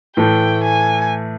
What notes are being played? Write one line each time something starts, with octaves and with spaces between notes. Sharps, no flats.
A2 E3 A3 G5
G#5